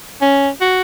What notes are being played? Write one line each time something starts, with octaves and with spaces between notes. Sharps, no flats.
C#4
F#4